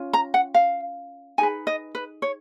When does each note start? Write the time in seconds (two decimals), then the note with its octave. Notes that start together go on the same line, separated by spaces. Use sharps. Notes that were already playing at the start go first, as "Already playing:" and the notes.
Already playing: C#4 F4
0.13 A#5
0.34 F#5
0.54 F5
1.38 D#4 G#4 B4 G#5
1.67 D#5
1.95 B4
2.22 C#5